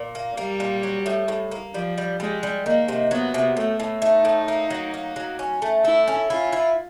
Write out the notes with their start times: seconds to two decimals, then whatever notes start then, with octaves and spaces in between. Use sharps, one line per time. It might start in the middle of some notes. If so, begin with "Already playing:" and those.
Already playing: A#2
0.15 A#3
0.37 G3 A#3
0.60 A#2
0.83 F#3
1.06 A2
1.28 A2
1.51 A#3
1.74 F3 G3
1.98 G3
2.20 G3 G#3
2.43 G3
2.65 D#3 A#3
2.88 C3
3.11 F#3 B3
3.34 C3
3.57 A2 A3
3.80 A2
4.02 A3 D#4
4.25 A2
4.48 A#3
4.70 F#3
4.94 A#3
5.16 F#3
5.39 C#4
5.62 A3
5.85 E4 A4
6.08 C#4
6.30 E4 F4
6.52 E4